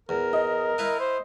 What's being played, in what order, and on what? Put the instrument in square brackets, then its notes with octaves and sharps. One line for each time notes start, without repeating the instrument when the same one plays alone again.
[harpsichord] E2 [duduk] A#4
[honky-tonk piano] D#5
[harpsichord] E4 B4 F5
[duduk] C5